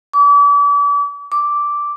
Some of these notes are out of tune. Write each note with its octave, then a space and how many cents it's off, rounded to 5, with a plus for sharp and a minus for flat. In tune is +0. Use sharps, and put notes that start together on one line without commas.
D6 -40
D6 -5